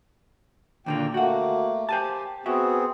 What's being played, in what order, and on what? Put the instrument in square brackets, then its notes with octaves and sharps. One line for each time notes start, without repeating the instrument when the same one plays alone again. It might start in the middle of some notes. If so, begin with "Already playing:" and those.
[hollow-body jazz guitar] D#2 D3 A#3 [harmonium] A#2 G5
[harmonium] A3 A#3 [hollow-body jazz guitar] F#4 F#5
[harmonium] G4 [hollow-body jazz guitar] C5 G#5 A5
[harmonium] B3 C4 G#4 [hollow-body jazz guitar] F#4 E5